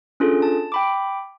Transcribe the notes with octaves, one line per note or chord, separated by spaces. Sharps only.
C#4 D4 F4 G#4 A4
A5
G5 B5 D6